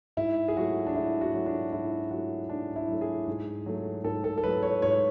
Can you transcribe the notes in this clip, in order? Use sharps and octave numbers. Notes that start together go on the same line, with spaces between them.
G#2 E4
G#4
F#3 A3 F#4
D4
G#2 E4
F#4
F#3 A3
D4
G#2 E4
F#3 A3 F#4
G#2 D4
E4
F#3 A3
G#4
G#2
F#3 A3
G#2 A4
A4
A4
F#3 A3 B4
C#5
G#2 C#5